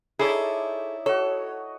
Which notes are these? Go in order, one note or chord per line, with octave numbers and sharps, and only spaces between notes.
D#4 E4 G#4 A4 C#5 D5
F#4 A4 C#5 D#5